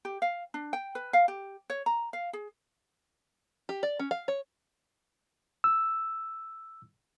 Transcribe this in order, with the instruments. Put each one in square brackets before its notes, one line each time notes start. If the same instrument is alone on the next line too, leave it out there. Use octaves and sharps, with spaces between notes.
[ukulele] G4
F5
D4
G5
B4
F5
G4
C#5
A#5
F5
G#4
[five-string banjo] G4
D5
C#4
F5
C#5
[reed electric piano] E6